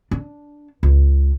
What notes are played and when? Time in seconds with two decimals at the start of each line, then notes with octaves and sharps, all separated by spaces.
0.11 D4
0.83 C#2